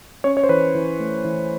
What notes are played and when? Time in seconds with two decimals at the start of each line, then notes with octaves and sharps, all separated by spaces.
0.24 C#4 C#5
0.37 C#5
0.44 C5
0.49 E3 B4
0.75 E3
1.00 A3
1.25 E3